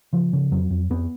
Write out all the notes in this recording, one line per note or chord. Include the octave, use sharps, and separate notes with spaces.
C#3 F3
C#3
F2 F#3
F2
F2 B3